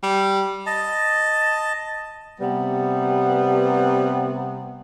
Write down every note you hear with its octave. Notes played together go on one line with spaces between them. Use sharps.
G3
D#5 A5
C3 G3 B3